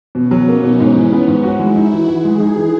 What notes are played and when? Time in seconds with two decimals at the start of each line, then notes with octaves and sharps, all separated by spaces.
0.15 B2 C#4
0.31 F#3
0.48 A#3 D#4
0.63 B2
0.80 G#2 C#4
0.96 E3
1.12 B3
1.28 G#2
1.44 E4 F#4
1.60 G#3
1.76 D#4 F#4
1.92 E3
2.08 E3 G#4
2.25 G#3
2.40 D#4
2.56 E3